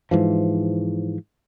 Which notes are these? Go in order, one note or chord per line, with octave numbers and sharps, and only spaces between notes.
G#2 E3 F3